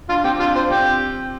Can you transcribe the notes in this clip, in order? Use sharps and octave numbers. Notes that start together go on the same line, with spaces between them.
D4 F4
C4 G4
D4 F4
F4 C5
C4 G4